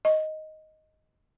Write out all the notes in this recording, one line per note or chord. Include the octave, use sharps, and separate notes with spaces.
D#5